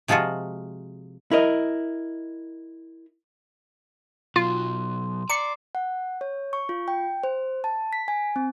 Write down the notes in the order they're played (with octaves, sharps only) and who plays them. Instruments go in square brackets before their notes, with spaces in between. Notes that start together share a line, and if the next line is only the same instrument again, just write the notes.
[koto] C3 F3 G#3 F4 F#4
[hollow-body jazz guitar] E4 A#4 D#5
[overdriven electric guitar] B2 F#3 [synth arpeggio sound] F4 [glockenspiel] C6
[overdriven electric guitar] D5 [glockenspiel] A#5 D6 C7 [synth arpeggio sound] C#7
[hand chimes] F#5
C#5
C#6
F4
G5
C5
A5
B6
G#5
C4